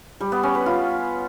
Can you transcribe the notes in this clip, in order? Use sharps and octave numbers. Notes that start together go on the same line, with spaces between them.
G3
B3
C#4
B4
F4